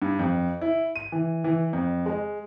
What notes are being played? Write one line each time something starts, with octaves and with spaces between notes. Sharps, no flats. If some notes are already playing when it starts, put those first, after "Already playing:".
G2
F2
E4
D#7
E3
E3
F2
G#3